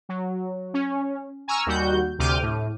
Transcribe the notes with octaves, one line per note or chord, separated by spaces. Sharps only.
F#3
C#4
G#5 A#5 C#6 E6 F6
D#2 G3 F#4 G6
D2 C3 D6 F6 G6 D#7
A2